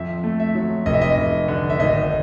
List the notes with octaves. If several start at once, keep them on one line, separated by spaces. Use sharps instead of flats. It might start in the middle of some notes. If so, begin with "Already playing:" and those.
Already playing: F2 E5
A3
E5
F#3
F1 D#5
E5
D#5
F1
D3
E5
G#1 D#5